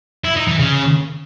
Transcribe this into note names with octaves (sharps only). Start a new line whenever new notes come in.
E4
D#4
E3
C#3